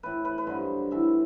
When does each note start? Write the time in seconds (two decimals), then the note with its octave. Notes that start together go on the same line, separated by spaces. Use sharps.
0.03 A2 E3 B4
0.25 B4
0.38 B4
0.47 G2 D3 F#3 C5
0.91 A2 E3 E5